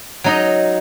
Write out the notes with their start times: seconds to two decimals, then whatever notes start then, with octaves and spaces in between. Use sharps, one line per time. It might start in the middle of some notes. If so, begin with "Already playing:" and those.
0.24 F#3 D#4 D#5